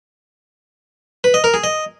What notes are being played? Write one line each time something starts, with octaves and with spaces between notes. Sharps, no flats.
B4
D#5
A#4
G#4
D#5